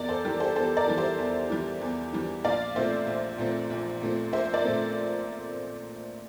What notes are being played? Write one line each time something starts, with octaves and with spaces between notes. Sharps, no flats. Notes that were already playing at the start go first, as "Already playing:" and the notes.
Already playing: E2 A#4 D5
A4 C5
E3 G3 G4 A#4
A4 C5
E2 A4 C5
A#4 D5
E3 G3
C5 E5
E2
E3 G3
E2
E3 G3
A#1 D5 F5
A#2 A3 C4 C5 E5
A#1
A#2 A3 C4
A#1
A#2 A3 C4
A#1 C5 E5
A#4 D5
A#2 A3 C4